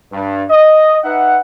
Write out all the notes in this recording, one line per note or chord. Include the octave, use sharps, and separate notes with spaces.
G2
D#5
D#4 B4 E5 F#5